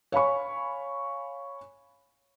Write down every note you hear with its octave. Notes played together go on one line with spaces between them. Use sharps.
C#5 F5 G#5 B5 C#6